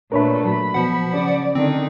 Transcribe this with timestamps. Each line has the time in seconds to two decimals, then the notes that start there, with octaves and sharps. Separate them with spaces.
0.12 A#2 A3 D4 A#4 B4 C#5 E5 B5
0.45 F#3 B5
0.74 B2 F3 F#5
1.14 C#3 D5
1.55 D3 D#3 C4 D#4